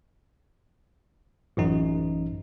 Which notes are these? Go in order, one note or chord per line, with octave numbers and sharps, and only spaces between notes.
A1 F#2 D#4